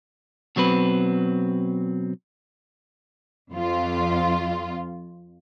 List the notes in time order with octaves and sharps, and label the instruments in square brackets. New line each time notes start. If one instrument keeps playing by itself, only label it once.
[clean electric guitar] B2 F#3 C4 B4
[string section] F2 F4